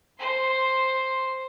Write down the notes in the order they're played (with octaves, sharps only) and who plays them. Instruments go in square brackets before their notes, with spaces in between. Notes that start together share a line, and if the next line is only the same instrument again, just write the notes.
[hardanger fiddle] C5 C6